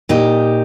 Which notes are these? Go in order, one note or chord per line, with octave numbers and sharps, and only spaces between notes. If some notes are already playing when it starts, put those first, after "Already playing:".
A#2 D#4 G4